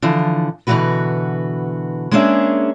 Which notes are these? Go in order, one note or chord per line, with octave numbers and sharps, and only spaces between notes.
D3 E3 F3
B2 D3 E3 A3 F#4 B4
G#3 A#3 C#4 D4 G#4 E5